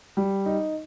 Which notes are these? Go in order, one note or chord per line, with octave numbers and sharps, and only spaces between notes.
G3
D#4